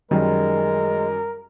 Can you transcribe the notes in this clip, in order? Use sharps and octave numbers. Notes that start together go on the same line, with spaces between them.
F#2 D#3 G3 G#3 A#4